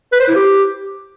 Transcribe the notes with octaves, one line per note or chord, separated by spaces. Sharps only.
B4
C5
E4
G4